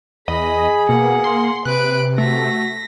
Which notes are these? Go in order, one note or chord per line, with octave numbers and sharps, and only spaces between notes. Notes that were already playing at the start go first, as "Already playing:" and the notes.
E2 G#4 D#5 B5
B2 A#3 F#5
C6
C3 B4 F#6 D7
A3 F#4 A#6 B6